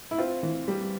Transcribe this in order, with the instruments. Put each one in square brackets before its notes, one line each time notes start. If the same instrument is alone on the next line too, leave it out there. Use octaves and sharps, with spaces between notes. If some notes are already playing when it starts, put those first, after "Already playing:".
[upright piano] E4
C4 F4
E3
G3